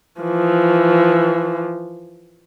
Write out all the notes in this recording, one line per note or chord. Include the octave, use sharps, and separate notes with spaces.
E3 F3